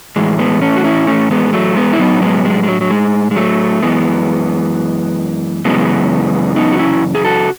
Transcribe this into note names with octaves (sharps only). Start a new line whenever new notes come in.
A2 E3 G#3
G#3 B3
A3 C#4
F#4
C#4 E4
A3 C#4
G#3 B3
F#3 A3
G#3 B3
E4
A2 F#3 B3 D#4
G#3 B3
G#3
G#3
F#3
F#3
G#3
G#3
F#3 A3
F#2 E3 G#3 B3
F#2 C#3 E3 G#3 B3
B3 D#4
F#4
C#4 E4
G#4
F#4 A4